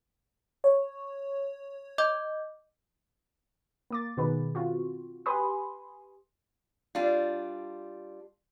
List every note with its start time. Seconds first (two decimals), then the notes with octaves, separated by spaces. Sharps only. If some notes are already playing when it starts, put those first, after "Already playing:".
0.64 C#5
1.98 D#5 D6 G6
3.91 A#3 D6 A6
4.17 B2 D#3 B3 G#4 B4
4.55 C4 F4 F#4
5.26 G4 B4 G#5 B5 C6 D#6
6.95 G3 D4 F4